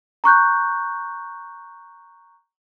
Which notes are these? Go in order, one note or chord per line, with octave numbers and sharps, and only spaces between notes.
A#5 C#6 F#6 G6